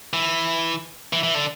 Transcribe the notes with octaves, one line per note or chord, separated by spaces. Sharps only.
E3
E3
E3
D3